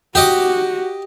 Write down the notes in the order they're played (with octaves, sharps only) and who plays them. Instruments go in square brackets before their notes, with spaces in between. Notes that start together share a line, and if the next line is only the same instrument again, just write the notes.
[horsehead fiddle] F#4 [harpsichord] G4 D#5 D6